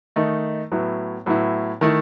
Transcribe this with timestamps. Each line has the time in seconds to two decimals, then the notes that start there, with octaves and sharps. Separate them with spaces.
0.16 D#3 A3 D#4
0.72 A2 F#3 B3 E4
1.26 A2 F#3 B3 E4
1.81 D#3 A3 E4